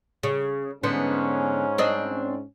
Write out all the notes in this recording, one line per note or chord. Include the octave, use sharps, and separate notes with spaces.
C#3
G#2 D3 B3 C#4 C5
C4 D4 D#5